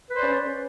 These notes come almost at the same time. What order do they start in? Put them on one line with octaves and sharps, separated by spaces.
B4 C5 D5 C#4